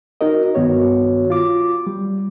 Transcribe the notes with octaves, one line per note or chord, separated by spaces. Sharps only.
D#4 F#4 A#4 D#5
G2 D#3 B3 F#4 C#5
F4 D6
G3